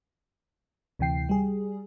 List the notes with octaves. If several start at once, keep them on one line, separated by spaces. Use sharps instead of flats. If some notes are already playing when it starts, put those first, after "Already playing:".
D2 C3 E3 G5 C7
G3 G#4